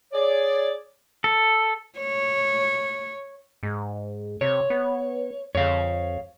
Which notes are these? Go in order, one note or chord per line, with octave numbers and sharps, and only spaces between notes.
G#4 C#5 D5
A4
C#5
G#2
C3 C#5
B3
F2 C#5 F5